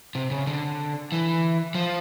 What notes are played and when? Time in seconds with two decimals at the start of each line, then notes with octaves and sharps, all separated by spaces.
0.15 C3
0.31 C#3
0.47 D3
1.12 E3
1.75 F3